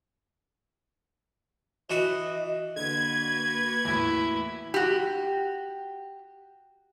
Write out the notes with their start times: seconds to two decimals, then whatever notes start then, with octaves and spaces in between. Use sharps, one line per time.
1.90 E3 F#4 D#5
2.76 D3 A#3 F#4 B4 G#6
3.85 E2 A2 E4
4.74 F#4 G4